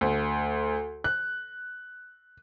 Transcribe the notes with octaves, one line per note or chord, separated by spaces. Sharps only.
D2
F#6